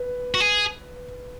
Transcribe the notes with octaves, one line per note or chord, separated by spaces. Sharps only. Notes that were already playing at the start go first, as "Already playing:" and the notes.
Already playing: B4
F#4
G#4